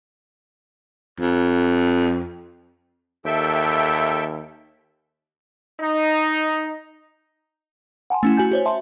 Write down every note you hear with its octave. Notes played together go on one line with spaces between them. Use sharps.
F2
D#2 A4 E5 G5
D#4
F#5 G#5 A5 C6
A3 C#4 E4
F#4 G#5 G6
F#4 C5 C#5
E5 A5 C6